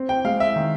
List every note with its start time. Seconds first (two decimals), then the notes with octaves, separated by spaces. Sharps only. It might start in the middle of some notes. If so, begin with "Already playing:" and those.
Already playing: C4
0.09 G5
0.25 G#3 F5
0.40 E5
0.56 D#3